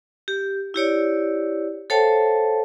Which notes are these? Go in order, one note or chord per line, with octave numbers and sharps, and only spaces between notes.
G4
E4 G4 C#5 D5
A4 C5 C#5 F5 G5 A5